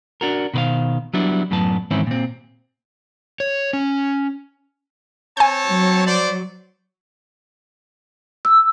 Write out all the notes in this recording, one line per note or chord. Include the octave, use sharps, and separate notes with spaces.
D4 F#4 A#4
B2 D#3 B4 C5 F5
F#3 G3 B3 D4 E4
F#2 A2 F#3 B3 A5
G#2 D#3 E3 C4 C#4 E4
A#2 C4
C#5
C#4
C4 C#5 G#5 A5 G6
F#3
C5 D5
E6